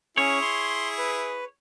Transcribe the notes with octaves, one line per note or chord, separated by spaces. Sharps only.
C#4 E4 G#4 C#5
C6
B4